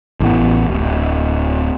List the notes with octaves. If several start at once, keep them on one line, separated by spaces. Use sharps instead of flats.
A1 A2 B3
D1